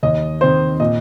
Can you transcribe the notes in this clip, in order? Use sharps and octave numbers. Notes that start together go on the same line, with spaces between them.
D#2 D#5
D#3 C4 C5
A#2 D#5